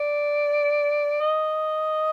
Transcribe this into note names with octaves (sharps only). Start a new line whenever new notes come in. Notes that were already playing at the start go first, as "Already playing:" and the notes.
Already playing: D5
D#5